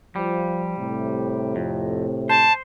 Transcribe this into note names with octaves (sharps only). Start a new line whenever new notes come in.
F3 G3
A2 C3
F2
C5 A5